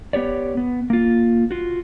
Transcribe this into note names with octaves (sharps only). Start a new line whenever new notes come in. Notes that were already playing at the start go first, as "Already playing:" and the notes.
B3 G4 C#5 D5
B3
A#3 F4
F4 F#4